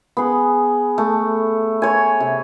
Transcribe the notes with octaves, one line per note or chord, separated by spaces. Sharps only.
B3 G#4
A3
C#5 G#5
C3